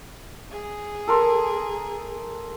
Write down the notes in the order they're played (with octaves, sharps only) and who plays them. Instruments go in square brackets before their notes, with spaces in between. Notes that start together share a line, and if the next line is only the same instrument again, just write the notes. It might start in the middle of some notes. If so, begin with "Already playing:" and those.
[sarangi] G#4
[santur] A4 A#4 C6